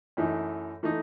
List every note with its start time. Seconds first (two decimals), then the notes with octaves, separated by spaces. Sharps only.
0.17 F#2 E3 A3 D#4
0.83 E3 A3 D#4